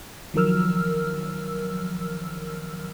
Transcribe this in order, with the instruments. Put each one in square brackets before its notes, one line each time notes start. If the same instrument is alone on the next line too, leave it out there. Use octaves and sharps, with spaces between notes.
[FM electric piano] D#3 F3 F#3 A#4 E6 F6